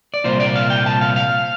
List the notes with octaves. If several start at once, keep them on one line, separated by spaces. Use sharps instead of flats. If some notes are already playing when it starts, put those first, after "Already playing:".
D5
C2 A#2 F3 C5
D5
F5
G5
A5
F5
F5